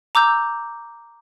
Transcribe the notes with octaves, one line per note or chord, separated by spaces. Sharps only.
A#5 D6 E6 G6